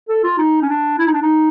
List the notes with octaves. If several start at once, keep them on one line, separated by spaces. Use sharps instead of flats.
A4
F4
D#4
C#4
D4
E4
D#4
D4
D#4